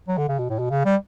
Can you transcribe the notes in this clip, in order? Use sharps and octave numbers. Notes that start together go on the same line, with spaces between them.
F#3
D3
C#3
B2
A2
B2
C#3
G3